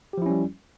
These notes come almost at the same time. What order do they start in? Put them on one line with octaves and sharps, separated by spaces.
G4 F3 E4 C#4 G3